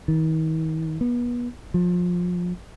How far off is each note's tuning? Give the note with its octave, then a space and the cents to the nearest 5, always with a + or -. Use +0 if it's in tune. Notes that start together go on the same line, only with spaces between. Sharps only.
D#3 +40
B3 -30
F3 +25